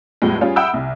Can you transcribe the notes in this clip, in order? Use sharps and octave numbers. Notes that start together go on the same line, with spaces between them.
E2 A2 F3 G3 G#3
G3 C#4 F4 G#4
E5 F#5 G5 B5 D#6 E6
C2